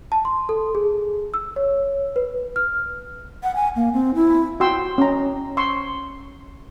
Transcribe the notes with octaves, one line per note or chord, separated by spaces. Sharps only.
A5
C6
A4
G#4
E6
C#5
B4
F6
F#5
G#5
A#3
C4
E4
F#4 G5 C6 E6
C#4 A#5
C6 C#6 E6